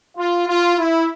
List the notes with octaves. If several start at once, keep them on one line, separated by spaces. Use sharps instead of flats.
F4
F4
E4